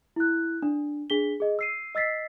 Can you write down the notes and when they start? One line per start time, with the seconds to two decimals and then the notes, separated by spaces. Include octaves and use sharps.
0.16 E4 F#6
0.62 D4
1.10 D4 G#4 B6 G7
1.40 G#4 D#5
1.59 E6 C7 D#7
1.95 D#5 E6 A6 B6 C7